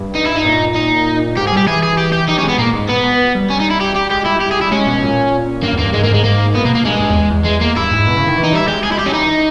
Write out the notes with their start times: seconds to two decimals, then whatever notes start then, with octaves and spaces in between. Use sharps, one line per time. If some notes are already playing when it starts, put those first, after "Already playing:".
Already playing: G2
0.15 D#4
0.25 E4
0.36 D#4
0.45 A#2
0.76 D#4
1.37 G#2 G4
1.47 G#4
1.52 G3 G4
1.67 E3 G#4
1.83 G#4
1.97 G4
2.12 G4
2.28 G3 D#4
2.38 C#4
2.43 G#3
2.49 B3
2.58 A#2 A#3
2.74 G#2
2.89 B3
3.04 B2
3.35 G3
3.50 C#4
3.60 D#4
3.71 E4
3.81 G4
3.96 G4
4.11 G#3 G4
4.26 G3 E4
4.41 G4
4.52 G#4
4.62 E4
4.72 G#3 C#4
4.87 B2
5.03 A#2
5.63 G2 A#3
5.73 E2
5.79 G2 A#3
5.93 G#2 G#3
6.04 A#3
6.14 G#3
6.24 A#3
6.54 A#2 B3
6.65 B2 A#3
6.75 A#3
6.85 G2 G#3
7.01 G2
7.10 E2
7.30 E2
7.46 G#3
7.61 A#3
7.76 G2 E4
7.91 G#2
8.07 B2
8.17 C#3
8.27 D#3
8.37 E3
8.44 D#4
8.53 G3 E4
8.68 G#3 G4
8.83 G#3 G#4
8.92 E4
8.98 G3 G4
9.06 C#4
9.13 E3 D#4